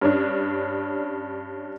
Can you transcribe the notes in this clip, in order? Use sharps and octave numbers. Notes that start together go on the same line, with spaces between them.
G2 C#4 D4